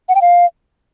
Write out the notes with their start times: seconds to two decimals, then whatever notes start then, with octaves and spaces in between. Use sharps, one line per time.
0.09 F#5
0.15 G5
0.22 F5